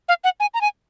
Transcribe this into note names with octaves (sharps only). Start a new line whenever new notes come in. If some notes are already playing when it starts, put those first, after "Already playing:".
F5
F#5
G#5
A#5
G#5